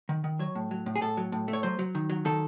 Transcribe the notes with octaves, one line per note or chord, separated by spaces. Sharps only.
D#3
D#3
F#3 C#5
A2
F#3
A2
G#4
A2 A4
F#3
A2
A3
C#5
F#3 C5
F#3
D#3
F#3
D#3 A4